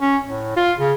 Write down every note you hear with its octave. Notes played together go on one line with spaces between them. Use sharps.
C#4
A2
F4
C#3